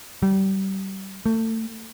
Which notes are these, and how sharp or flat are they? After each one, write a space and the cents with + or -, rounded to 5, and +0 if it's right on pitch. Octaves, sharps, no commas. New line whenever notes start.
G3 -25
A3 +30